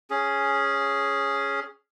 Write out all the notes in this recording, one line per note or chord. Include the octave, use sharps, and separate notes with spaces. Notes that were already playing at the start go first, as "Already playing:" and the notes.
C#4 G#4